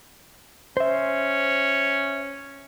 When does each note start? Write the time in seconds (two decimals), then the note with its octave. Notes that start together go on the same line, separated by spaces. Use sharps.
0.77 C#4 C5 E5